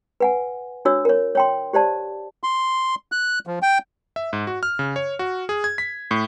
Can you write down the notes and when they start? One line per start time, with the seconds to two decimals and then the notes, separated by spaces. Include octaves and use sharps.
0.20 B4 F#5 G#5
0.85 D4 F#4 C#5 E6
1.05 A#4 C#5
1.35 C#5 G5 C6
1.73 G4 C5 D5 A5
2.43 C6
3.12 F#6
3.47 F3
3.62 G5
4.16 E5
4.33 G#2
4.47 F#4
4.63 F6
4.79 C#3
4.96 C#5
5.19 F#4
5.49 G#4
5.64 G#6
5.78 B6
6.11 A2